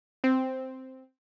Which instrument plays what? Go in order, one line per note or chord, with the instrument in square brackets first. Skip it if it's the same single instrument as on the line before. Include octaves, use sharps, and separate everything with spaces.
[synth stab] C4